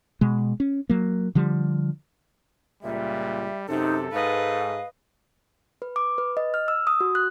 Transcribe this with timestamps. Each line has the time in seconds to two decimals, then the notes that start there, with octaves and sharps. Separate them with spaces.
0.21 B2 G#3
0.60 C#4
0.90 F#3 A#3
1.35 D3 F3 G3
2.83 C#2 A#2 G3 E5
3.69 F#2 C3 D#4 A4
4.12 G#2 B4 D#5 F5
5.82 B4
5.96 D6
6.18 B4
6.37 D#5
6.54 F6
6.68 E6
6.87 D#6
7.01 F#4
7.15 F#6